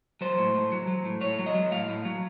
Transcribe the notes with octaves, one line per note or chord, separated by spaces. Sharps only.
F#3 C5
A2
A2
F#3
F#3
A2
A2 C#5
F#3
D#5
F#3
A2 F5
A2
F#3